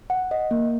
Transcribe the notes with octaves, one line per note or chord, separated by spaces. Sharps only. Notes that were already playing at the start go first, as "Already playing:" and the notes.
F#5
D#5
A#3